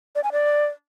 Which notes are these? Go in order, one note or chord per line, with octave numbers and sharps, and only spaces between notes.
D5
G#5
D5